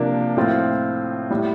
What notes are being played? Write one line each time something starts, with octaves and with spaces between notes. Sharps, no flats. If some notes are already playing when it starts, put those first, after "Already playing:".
Already playing: C3 F3 A#3 D4
A2 F3 C4 F4
A2 G3